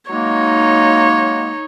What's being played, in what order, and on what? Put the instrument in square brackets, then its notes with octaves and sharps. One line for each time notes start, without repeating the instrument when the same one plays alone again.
[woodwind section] F#3 G#3 A#3 [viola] D#4 C#5